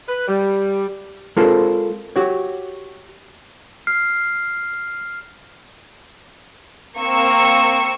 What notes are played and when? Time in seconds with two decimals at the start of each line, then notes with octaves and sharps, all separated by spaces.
0.08 B4
0.27 G3
1.37 G#3 C4 F4 A4 A#4 C5
2.16 F#4 G4 C#5
3.87 F6 C7
6.98 A#3 C4 C#6 E6